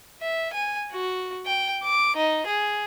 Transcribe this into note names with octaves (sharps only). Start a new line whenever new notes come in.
E5
G#5
F#4
G5
D6
D#4
G#4